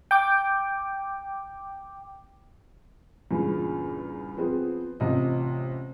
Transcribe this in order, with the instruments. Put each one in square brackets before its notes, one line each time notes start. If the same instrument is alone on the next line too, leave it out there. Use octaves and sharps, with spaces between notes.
[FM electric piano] G5 D6
[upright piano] E2 G2 A#2 C#3
F3 B3 C4 G#4
A1 C3 F4 D#5